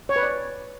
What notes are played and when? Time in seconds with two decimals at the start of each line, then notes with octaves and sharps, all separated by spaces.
0.09 C#5
0.16 B4
0.23 D5